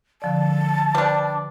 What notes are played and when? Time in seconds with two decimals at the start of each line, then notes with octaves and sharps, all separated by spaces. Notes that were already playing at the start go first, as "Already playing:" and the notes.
0.22 D3 F3 D5 A5
0.95 G3 D4 B4 C5